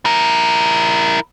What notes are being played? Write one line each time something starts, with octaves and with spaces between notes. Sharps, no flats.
E4 A#4